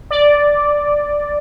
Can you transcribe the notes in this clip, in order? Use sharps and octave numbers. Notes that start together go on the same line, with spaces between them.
D5